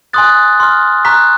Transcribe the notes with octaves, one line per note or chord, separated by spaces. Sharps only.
G#5 C6 D#6 F#6 A6
C6 F6
A#5 C#6 F#6 B6